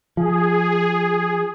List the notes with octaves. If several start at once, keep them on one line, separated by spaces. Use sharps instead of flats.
F3 G#4